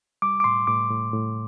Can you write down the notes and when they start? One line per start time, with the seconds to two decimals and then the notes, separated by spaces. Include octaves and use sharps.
0.22 G3 D6
0.40 D6
0.44 A2 C6
0.67 A2 D6
0.90 A2
1.13 A2